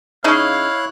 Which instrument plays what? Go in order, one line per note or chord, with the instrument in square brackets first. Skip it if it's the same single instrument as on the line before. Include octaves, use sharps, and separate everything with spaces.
[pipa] C#3 D#4 D#5 [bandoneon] E4 C#5 F#6 [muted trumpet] F5